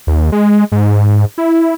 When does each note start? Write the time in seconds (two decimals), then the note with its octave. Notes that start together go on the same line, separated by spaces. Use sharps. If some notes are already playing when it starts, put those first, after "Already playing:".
0.07 D#2
0.32 G#3
0.72 G#2
1.38 E4